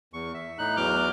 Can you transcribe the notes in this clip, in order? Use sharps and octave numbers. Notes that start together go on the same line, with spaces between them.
E2 C#6
E5
A2 D#4 F#6
E2 E3 F#3 D6 F6 G6